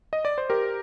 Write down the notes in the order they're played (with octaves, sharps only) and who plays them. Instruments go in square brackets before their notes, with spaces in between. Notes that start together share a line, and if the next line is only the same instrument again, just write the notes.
[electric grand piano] D#5
D5
C5
G4 A#4